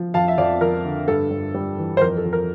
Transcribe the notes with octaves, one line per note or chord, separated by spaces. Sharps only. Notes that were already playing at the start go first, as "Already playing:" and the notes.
Already playing: F3
F2 F5 A5
E5
F2 D5 F5
F3 A#4
D3
G2 A4
G2
G3
E3
C5
F2 A#4
A4
F2
A#4